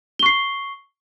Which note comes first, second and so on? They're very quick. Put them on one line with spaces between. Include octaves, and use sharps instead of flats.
G7 C#6 C7